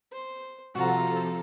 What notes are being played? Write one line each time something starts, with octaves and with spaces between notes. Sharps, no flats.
C5
C3 F3 F4 F#4 A4 A#5